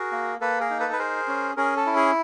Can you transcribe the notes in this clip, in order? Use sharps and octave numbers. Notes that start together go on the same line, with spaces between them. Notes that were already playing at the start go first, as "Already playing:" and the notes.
Already playing: F#4 G#4 A#4
A#3
A#3 A4 B4
G#4 A#4
D#4
A4 B4
B4
G#4 A#4 C5
C#4
C#4 G#4 A#4
A4
E4
G#4